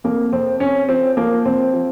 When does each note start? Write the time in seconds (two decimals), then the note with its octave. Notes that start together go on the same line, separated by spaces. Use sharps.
0.04 F2 A#3
0.32 F2 C4
0.60 F2 C#4
0.89 F3 C4
1.17 F3 A#3
1.45 F2 C4
1.73 F3